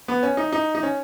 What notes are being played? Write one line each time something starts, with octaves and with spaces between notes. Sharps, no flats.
B3
C#4
D#4
D#4
D#4
C#4